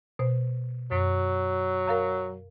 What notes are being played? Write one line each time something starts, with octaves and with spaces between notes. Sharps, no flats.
B2 C5
F#2 F#3
A#4 F5 A#5